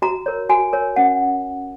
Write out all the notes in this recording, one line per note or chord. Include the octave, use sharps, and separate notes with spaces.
F#4 A#5
A#4 C#5
F#4 G#5
A#4 C#5
C#4 F#5